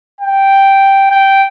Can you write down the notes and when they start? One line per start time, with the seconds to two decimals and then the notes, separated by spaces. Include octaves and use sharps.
0.21 G5
1.11 G5